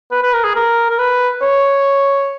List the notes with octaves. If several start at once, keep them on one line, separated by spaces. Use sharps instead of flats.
B4
B4
A#4
G#4
A#4
A#4
B4
C#5